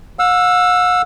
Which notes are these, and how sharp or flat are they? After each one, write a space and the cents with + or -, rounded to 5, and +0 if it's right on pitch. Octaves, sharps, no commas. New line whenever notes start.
F#5 -45 E6 +10